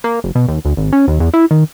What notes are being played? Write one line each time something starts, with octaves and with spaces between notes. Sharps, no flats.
A#3
F#1
B2
D#2
D2
G#1
C#4
D#2
E2
E4
D#3